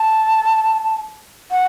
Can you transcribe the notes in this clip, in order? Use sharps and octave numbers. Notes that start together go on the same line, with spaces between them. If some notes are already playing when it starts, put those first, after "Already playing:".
Already playing: A5
F#5